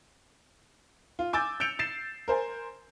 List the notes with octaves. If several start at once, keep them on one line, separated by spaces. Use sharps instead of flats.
F4
G#5 D6 E6 G6 A6
E6 G6 C#7 D7 F7
A6 C7 E7
A#4 C5 G#5